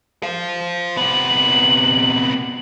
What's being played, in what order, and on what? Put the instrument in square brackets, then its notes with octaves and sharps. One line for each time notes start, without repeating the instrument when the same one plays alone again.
[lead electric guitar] C5 F5
[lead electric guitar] C3 B3 [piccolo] F#7